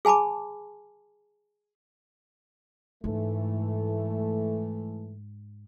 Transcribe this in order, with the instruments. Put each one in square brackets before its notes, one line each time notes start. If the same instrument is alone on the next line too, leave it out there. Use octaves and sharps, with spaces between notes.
[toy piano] G#4 G#5 A5 B5 D6
[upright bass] G#2 [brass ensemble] E3 A3